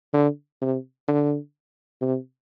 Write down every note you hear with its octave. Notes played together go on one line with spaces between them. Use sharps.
D3
C3
D3
C3